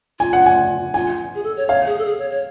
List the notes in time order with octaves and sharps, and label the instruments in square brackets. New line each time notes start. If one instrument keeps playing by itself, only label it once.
[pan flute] F4 [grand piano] G#5
[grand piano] F#5
G#5
[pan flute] F4 [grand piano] G#5
[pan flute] G#4
A4
C#5
[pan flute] C#5 [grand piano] F5
[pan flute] G#4
A4
G#4
C#5
C#5